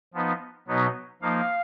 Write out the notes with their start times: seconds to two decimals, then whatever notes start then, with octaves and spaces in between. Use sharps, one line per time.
0.14 F3 B3 D#4
0.68 B2 F#3 B3 D#4
1.22 F3 A#3 D#4 F5